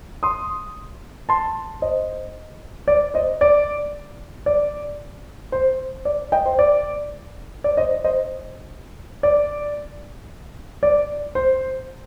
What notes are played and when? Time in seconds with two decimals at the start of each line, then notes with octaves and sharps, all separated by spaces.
0.23 C6 D#6
1.29 A5 C6
1.82 C5 D#5
2.88 D5
3.14 C5 D#5
3.41 D5
4.46 D5
5.52 C5
6.05 D5
6.32 D#5 G5
6.46 C5
6.59 D5
7.64 D5
7.77 C5 D#5
8.04 C5 D#5
9.23 D5
10.83 D5
11.35 C5